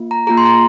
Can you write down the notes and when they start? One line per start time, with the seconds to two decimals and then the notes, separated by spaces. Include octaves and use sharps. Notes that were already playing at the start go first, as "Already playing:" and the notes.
Already playing: A#3 F4
0.11 A#5
0.27 A#3 F4 G#4 A#5
0.37 C6
0.45 A#5